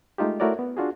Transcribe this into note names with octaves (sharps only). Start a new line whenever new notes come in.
G#3 A3 D#4 F4 G4
A3 E4 F#4 A#4 C#5 D5
B3
D4 F4 F#4 G#4